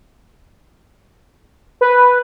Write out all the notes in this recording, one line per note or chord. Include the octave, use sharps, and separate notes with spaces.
B4